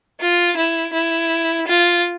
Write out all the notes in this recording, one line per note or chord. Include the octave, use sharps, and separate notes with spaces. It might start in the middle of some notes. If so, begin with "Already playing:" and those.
F4
E4
E4
F4